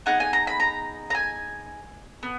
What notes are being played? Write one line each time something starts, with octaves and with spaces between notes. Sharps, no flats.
B3 D#4 G#4 F#5
G#5
A#5
B5
A#5
A#5
G#5
B3